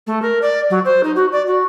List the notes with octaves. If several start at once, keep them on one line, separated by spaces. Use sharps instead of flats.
A3
A#4
D5
F#3
C5
D#4
F#4
D5
F#4